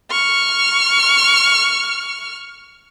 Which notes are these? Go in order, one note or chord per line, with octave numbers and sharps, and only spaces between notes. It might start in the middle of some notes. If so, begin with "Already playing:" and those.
C#6 F6